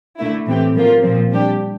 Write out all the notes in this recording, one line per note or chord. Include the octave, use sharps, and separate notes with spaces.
D3 A3 E4
A2 E3 A3 C4 G4
A2 F3 A#3 F4
A#2 F3 C4
G3 D4 G4